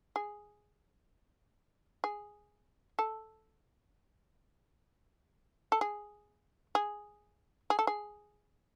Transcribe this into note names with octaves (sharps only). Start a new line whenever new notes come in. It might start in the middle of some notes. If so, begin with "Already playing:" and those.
G#4
G#4
A4
A4
G#4
G#4
G#4
A4
G#4